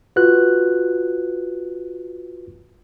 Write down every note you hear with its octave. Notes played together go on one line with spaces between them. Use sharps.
F4 F#4 B4 F#6